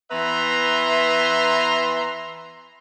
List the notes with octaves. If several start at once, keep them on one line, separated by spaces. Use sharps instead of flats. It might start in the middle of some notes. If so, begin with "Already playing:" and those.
E3 B3 B4 E5 A#5 C6